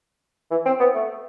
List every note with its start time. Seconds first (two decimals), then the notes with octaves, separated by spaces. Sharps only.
0.51 E3
0.65 C4
0.80 B3
0.95 A3